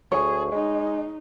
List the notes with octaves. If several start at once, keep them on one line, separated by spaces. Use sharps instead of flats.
D2 G#4 C#5
G#3 D#4